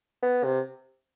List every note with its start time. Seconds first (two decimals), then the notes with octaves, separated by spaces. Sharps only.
0.23 B3
0.44 C3